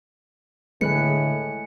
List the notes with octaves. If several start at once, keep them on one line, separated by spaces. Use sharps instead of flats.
A2 D3 G#3 G#4 B4 G#5 F#6 C#7